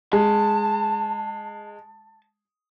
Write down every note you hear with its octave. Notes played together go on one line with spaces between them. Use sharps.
G#3 A5